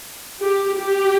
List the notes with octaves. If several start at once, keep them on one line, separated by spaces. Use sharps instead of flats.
G4
G4